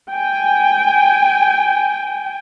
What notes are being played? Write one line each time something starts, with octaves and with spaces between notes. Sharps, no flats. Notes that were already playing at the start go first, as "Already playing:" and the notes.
G5 G#5